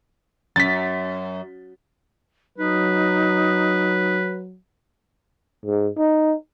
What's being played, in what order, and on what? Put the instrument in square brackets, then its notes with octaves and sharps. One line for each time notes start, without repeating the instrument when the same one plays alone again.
[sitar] F#2 [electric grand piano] A6 B6
[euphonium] F#3 [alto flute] D#4 [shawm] B4
[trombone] G#2
D#4